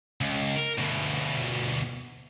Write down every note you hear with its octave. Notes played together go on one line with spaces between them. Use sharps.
C#2
A#4
D2 B2